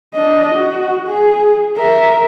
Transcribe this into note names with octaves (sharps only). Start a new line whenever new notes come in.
D4 D#5
F#4
G#4
A#4 E5